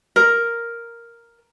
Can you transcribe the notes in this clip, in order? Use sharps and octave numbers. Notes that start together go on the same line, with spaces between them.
A#4